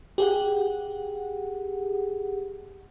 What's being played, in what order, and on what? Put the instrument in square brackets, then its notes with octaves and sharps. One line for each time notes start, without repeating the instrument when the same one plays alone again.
[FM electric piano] G4 G#4 F#5